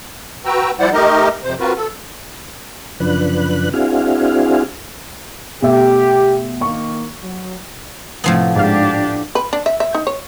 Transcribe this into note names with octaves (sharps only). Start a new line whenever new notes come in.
F#4 B4 G5 A#5 E6
F3 G3 E4 C5 D5 F#5
A3 D#4 G4 A#4 D#5
F2 C3 C5
C4 F4 F#4 A#4 B4
A4
F#2 C#3 F3 D4 B4 F#6
C4 D4 E4 F#4 G#4 F5
B2 A3 G4 E5
D#3 A#3 C#6
F#3
A2 C3 F3 A3 B3
G#2 D4 G4 F5
B4
D4
E5
E5
D#4
C#5